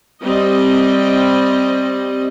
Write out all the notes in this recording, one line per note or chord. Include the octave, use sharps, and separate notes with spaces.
G3 C4 D#5